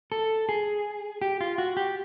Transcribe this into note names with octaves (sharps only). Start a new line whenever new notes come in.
A4
G#4
G4
F4
F#4
G4